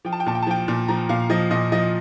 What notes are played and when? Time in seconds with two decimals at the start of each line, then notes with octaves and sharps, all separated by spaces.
0.05 F3 G5
0.13 A5
0.20 G5
0.26 A#2 A5
0.35 G5
0.42 A5
0.47 F3 G5
0.68 A#2
0.88 F3 A#5
1.09 A#2 F5
1.30 F3 D#5
1.51 A#2 D#5
1.72 F3 D#5